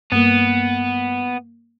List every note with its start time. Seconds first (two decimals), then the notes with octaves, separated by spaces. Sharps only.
0.12 G2 A#3 B3